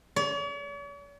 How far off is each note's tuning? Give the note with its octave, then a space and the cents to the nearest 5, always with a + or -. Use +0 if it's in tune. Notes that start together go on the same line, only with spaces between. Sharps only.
C#5 +45